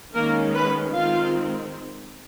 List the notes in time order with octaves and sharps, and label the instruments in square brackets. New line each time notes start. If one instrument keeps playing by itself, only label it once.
[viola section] D#3 G#3 A#3 C#4 A#4
B3 B4
D#3 G#3 C4 F4 F5